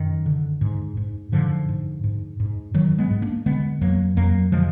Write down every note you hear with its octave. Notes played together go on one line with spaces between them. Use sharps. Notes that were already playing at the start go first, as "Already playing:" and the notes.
Already playing: F#2 D#3
D3
G#2
G#2
G#2 D3 F3
G#2
G#2
G#2
G#2 D#3 F#3
G#3 B3
G#2
A#3 D4
D3 G#3 B3
F2 F#3 A#3
F2 F#3 A#3
D3 F3 G#3